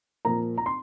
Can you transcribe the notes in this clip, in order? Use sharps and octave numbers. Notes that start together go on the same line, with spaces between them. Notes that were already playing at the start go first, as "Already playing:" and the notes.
A#2 F3 A#3 A#5
A#5
C6